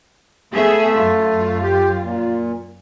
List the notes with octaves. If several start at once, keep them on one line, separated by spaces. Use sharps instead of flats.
A3 B3 G#4 E5
F#2 F4
G4
A#2